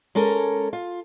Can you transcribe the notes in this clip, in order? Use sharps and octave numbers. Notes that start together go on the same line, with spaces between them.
G#3 C#4 A4 A#4
F4